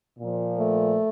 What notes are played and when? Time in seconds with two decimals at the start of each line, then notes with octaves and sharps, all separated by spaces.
0.19 A#2 F3
0.59 A3